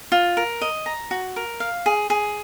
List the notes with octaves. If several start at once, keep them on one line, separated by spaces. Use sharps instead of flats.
F4
A#4
D#5
A#5
F#4
A#4
F5
G#4
G#4